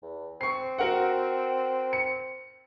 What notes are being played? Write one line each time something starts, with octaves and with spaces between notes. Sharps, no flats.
E2
C4 C#6 C7
F#4 A#4 F#5
C#7